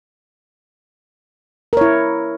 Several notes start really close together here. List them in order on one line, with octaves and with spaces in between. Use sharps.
A#4 C#5 E4